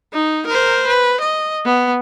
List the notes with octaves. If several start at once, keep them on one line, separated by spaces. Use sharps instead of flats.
D#4
A#4 C5
B4
D#5
B3